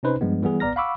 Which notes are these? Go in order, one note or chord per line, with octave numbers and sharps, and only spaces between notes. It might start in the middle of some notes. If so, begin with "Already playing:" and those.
C3 C#4 D#4 B4 C5
G2 F3 G#3 B3
E3 G3 B3 G#4
A1 B3 D5 A#5 F6 A#6
F5 F#5 B5 C#6 D6 E6